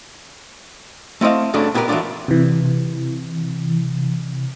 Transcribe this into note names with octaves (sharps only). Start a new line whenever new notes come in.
A3 C4 E4 D#5 F5
G2 C#3 F#3 A3 D4
B3 E4 G4 G#4 A#4 B4
E3 F#3 A3 B3 D4 F4
C3 E3